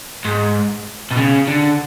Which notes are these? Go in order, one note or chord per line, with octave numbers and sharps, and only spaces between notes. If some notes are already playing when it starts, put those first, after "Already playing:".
G#2
B2
C#3
D3